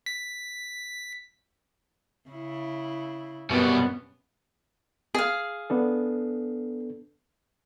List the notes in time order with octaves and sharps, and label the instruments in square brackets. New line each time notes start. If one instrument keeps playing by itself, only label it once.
[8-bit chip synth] B6
[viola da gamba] C#3 E4
[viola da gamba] F#2 B3 C#4 [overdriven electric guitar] B2 G3
[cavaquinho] G#4 F5
[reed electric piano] B3 D4 A4